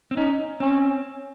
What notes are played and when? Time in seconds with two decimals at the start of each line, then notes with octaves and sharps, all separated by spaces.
0.11 C4
0.17 C#4 D#4
0.60 C4 C#4